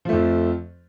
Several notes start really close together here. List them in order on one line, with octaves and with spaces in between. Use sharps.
F3 A3 F2